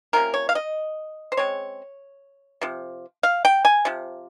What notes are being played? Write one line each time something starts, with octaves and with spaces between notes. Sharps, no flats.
C3 F3 A#3 C#4 A#4
C#5
F5
D#5
C5
C#3 G#3 C4 C#5
C3 F3
F5
G5
G#5
C3 F3